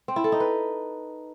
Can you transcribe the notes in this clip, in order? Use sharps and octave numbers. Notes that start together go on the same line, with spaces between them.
C4
E4
A4
D#4
B4